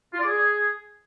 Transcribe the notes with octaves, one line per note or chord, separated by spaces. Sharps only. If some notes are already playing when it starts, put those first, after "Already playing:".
F4
D5
G#4